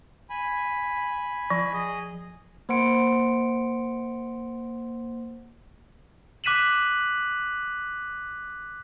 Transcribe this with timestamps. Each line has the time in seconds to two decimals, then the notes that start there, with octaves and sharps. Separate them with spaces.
0.30 G#5 B5
1.50 F3
1.73 G#4 D#5
2.69 A#3 C5 F#5 C6 C#7 D7
6.44 D6 F#6 B6 D#7 E7 F#7